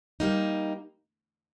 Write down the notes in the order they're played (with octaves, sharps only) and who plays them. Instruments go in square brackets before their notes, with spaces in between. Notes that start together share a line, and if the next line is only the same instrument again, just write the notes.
[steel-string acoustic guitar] G3 A#3 D#4